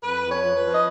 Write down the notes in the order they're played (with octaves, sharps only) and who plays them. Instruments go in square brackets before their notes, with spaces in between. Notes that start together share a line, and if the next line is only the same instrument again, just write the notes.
[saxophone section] F2 B4
F2
C#5
F3
B4
F3
D#5